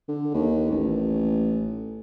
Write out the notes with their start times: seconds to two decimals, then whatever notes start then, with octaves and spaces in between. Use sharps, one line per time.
0.08 D3
0.34 D#2
0.70 A1